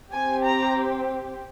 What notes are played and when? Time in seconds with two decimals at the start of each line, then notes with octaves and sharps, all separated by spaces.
0.13 C4 G4 G#5
0.45 A#5